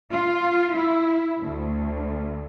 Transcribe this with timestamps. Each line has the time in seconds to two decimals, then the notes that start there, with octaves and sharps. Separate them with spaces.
0.11 F4
0.75 E4
1.40 D2